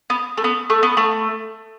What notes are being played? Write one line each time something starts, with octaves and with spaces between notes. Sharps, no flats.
B3
A3
B3
A3
B3
A3